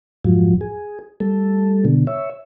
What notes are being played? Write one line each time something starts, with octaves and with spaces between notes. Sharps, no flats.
F2 G#2 F3 F#3
G#4
G3 A3 A4
B2 D3
C#5 E5